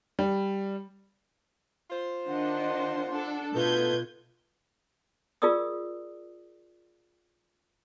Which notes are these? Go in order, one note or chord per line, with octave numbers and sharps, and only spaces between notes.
G3
F4 C5
D#3 D4 D#5 F#5
D4 A4
B2 A3 D#4 F4 A4 B4 G6 G#6
F4 G#4 A#4 D5 D#6 E6